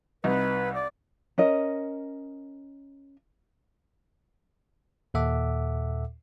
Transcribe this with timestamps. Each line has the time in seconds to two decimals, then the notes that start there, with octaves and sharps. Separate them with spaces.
0.24 C2 D#4 B4
0.73 D5
1.38 C#4 A#4 D#5
5.14 D#2 A#2 A4 E5 F#5 D6